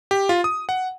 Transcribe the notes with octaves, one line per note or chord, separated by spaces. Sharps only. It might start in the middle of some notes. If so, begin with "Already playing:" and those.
G4
F4
D#6
F#5